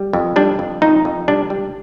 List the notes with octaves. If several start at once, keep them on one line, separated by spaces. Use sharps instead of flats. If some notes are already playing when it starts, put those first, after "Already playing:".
Already playing: G3
F2
G3 D4
F2
F2 D#4
F2
G3 D4
G3